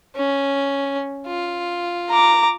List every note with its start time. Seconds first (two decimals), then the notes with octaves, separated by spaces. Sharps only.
0.16 C#4
1.27 F4
2.10 A#5 D6